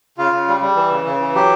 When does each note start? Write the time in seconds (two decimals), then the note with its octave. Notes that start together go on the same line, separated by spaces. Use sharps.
0.18 C#3 F4
0.32 C#3
0.48 G3
0.61 G3
0.76 E3
0.91 C#3
1.05 C#3
1.20 E3
1.34 F#3 G4